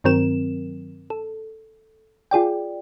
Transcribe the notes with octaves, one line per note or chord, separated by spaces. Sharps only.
G2 D#3 F#3 C4 A#4 E7
A4
F4 G#4 D5 G5